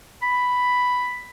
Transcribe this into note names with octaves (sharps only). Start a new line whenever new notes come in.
B5